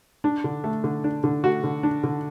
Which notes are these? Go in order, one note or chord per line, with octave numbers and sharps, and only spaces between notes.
D4
D3
A3
D3
D4
D3
A3 F#4
D3
D4
D3